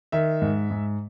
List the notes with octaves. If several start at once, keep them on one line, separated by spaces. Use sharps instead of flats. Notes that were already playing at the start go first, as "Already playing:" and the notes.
D#3 E5
G#2
G#2